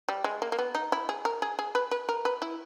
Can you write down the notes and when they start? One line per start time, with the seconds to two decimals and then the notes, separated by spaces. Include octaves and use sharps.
0.09 G3
0.24 G#3
0.42 A#3
0.52 A#3
0.59 B3
0.75 D#4
0.92 E4
1.09 G#4
1.25 A#4
1.42 G#4
1.59 G#4
1.75 B4
1.91 B4
2.09 A#4
2.25 B4
2.42 E4